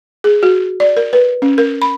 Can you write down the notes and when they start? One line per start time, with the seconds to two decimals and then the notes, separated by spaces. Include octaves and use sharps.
0.24 G#4
0.43 F#4
0.80 D5
0.97 A#4
1.13 B4
1.42 C#4
1.58 A#4
1.82 B5